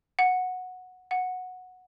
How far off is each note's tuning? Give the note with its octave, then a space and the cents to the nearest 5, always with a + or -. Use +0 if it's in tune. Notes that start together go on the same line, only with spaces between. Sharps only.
F#5 -10
F#5 -10